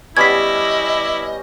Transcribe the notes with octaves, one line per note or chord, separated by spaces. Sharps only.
G3 B3 C#4 E4 D#5 G#6 B6